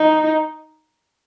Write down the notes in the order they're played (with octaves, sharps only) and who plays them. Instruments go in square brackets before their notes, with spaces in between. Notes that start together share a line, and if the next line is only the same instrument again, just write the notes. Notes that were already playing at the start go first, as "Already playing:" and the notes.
Already playing: [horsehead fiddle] D#4